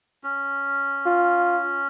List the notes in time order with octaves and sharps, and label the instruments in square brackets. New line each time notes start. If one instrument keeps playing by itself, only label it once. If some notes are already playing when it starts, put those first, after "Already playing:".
[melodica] C#4
[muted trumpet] F4